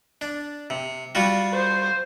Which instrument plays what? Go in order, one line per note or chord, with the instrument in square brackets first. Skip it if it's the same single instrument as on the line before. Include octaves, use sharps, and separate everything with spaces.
[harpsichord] D4
C3
G3 F4 F#4
[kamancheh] C5